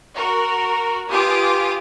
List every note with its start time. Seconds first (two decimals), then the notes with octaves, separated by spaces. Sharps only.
0.13 F#4 A#4
1.09 F4 G4 B4 G#5 D6 D#6